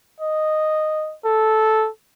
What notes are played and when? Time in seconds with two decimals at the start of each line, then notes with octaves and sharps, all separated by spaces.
0.20 D#5
1.26 A4